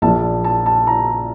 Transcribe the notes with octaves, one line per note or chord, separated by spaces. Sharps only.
A#1 A#2 F3 A5
A5
A5
A#5